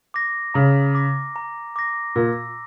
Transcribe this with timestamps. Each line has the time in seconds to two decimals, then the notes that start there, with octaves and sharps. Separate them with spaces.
0.14 D6 A#6
0.54 C#3 A#5
0.95 D6 A#6
1.36 A#5
1.76 D6 A#6
2.16 A#2 E6